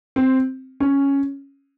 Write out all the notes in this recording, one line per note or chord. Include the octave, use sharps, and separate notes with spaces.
C4
C#4